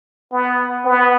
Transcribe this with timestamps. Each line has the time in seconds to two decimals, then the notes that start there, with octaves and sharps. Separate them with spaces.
0.32 B3
0.85 B3